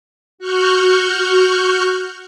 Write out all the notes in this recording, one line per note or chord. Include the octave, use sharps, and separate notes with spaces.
F#4 F#5 C#6 F6 G6